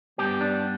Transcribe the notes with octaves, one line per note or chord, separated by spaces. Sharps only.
G2 G3 B3 G4
D4